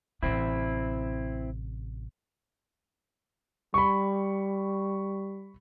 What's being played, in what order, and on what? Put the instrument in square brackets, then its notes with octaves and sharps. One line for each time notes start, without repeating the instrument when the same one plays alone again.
[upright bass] A1 C3 [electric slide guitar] C4 E4
[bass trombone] G3 [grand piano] B5 C#6